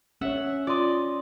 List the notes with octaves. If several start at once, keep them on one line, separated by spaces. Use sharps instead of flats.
C#4 C#5 E5 F#5
F4 D5 D#5 C6